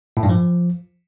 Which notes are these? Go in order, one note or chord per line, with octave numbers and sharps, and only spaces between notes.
A2
G2
F3